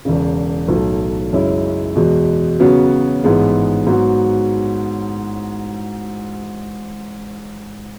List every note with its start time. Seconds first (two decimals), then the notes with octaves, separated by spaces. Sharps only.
0.05 E1 E2 C#3
0.68 B1 A2 F#3 A3
1.33 F#2 C#3 G#3 C#4 E4
1.96 E2 B2 G#3
2.60 C#3 F#3 B3 F#4
3.24 A1 G#2 G#3 B3
3.87 G#2 F#3 B3 F#4